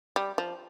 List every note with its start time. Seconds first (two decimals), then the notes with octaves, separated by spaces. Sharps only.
0.16 G3
0.38 F3